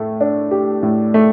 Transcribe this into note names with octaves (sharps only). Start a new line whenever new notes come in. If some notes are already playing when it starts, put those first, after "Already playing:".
Already playing: A2 A3
D4
G4
A2
A3